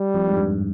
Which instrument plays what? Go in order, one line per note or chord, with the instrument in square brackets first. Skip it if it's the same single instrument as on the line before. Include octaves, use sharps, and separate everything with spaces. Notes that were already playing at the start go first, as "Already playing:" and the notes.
Already playing: [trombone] G3
[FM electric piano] F2
G#2
G2